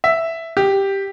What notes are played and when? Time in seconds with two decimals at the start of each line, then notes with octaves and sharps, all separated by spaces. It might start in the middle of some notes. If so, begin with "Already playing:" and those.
0.04 E5
0.57 G4